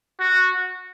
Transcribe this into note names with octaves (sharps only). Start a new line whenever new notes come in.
F#4